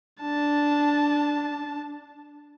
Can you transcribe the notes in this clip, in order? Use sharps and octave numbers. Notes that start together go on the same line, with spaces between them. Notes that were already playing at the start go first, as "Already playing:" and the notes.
D4 A5